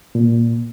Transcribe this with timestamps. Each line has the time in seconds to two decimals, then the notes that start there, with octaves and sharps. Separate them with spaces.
0.15 A#2